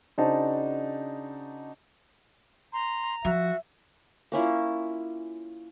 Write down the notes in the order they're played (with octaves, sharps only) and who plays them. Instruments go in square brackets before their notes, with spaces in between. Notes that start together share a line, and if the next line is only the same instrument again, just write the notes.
[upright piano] C#3 D4 D#4 F#4 C5 A5
[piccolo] A#5 [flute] C6
[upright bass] F3 [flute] F#4 [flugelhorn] E5
[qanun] A#3 C#4 E4 F4